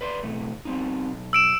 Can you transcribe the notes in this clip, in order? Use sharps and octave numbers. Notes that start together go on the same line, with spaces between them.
B4 D5 C6
B2 E3 A3
G3 C4 D#4
B1
E6 D7 E7